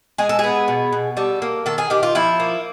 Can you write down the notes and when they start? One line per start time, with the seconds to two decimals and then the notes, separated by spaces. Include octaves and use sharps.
0.18 G#3 G#4
0.29 A4
0.39 B3 G#4
0.68 B2
0.93 B2
1.17 G3 A4
1.42 A#3
1.66 D#3 A4
1.78 G#4
1.90 D#3 G4
2.03 F4
2.15 F3 E4
2.40 A#3